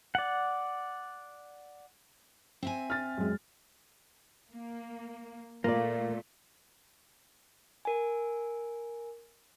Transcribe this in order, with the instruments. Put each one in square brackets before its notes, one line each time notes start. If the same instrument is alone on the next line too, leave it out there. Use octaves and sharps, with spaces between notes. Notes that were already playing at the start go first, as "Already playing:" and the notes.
[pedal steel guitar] D5 F#5
[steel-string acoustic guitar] C4 E5 G#5
[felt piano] F6 A6
F#2 G#3
[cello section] A#3
[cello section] A#2 A3 [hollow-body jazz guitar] A#3 [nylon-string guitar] F4 D5
[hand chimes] A#4 G#5